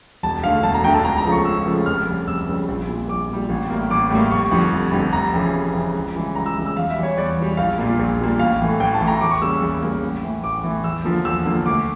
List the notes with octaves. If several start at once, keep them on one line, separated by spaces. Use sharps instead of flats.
E1 A5
D2 D3 A3 F5
E1 A5
A#5
D2 D3 A3 G5
A5
C#2 A#5
A#5
C#3 F3 A3
C#6
C#2 E6
C#3 F3 A3
F1 F6
F2 C#3 G3
F1 E6
F2 C#3 G3
A#1
A#2 G3
A#1 D6
A#2 G3
A1
A2 G3 A#3
A1 D6
A2 G3 A#3
F1 C#6
F2 D3 G3
F1
F2 D3 G3
F1 A#5
F2 C#3 E3
F1
F2 C#3 E3
C#2
C#3 E3 G3
C#2 A#5
E6
C#3 E3 G3
E6
E2 F5
E5
E3 G3
C#5
E2 D5
E3 G3
A#1 F5
A#2 G3 A#3
A#1
A#2 G3 A#3
A1 F5
A2 E3 A3
A1 G5
A5
A2 E3 A3
A#5
E2 D6
C#6
C#3 G3 A#3 E6
E6
E2
C#3 G3 A#3
A1
A2 E3
A1 D6
A2 E3
E2 E6
D3 F3 A#3
E2 E6
D3 F3 A#3
D2 D6